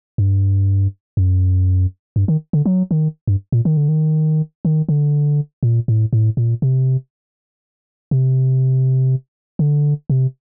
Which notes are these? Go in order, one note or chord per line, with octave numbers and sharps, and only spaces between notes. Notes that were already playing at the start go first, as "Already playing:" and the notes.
G2
F#2
G2
D#3
D3
F#3
D#3
G2
A#2
D#3
D3
D#3
D#3
D3
A#2
A2
A2
A#2
C3
C3
D3
C3